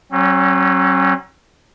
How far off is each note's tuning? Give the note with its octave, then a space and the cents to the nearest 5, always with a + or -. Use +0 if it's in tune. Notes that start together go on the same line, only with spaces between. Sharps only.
F#3 +30 C#4 -35